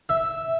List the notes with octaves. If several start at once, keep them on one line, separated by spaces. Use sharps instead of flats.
E5